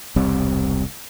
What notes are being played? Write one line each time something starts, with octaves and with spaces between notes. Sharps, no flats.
E1 C2 G3 C4